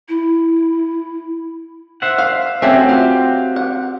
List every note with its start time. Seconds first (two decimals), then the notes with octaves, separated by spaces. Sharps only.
0.09 E4
2.02 C5 E5 F#5
2.18 F5
2.62 A3 C4 C#4 F#4 G4 E5
2.89 F4
3.56 F#5